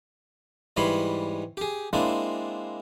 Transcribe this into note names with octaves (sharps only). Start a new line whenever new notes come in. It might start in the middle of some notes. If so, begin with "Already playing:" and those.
G#2 E3 G3 C#5 B5 C6
G4 G#4
G#3 A#3 C4 D4 E4